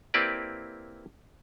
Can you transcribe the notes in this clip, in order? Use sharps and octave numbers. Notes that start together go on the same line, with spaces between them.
A#3 C4 E4 G4 B4 D5